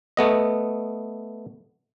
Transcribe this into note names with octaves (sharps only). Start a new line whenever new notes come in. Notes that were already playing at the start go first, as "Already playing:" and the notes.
A3 B3 D#5